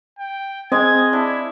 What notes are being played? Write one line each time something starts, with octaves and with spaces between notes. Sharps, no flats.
G5
G#3 C4 D#5 G#6
D4 E4